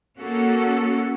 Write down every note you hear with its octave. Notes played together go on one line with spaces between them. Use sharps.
A#3 C#4 F#4 A4